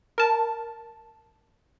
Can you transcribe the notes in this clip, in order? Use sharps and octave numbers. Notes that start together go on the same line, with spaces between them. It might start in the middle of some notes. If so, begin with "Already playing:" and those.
A#4 A5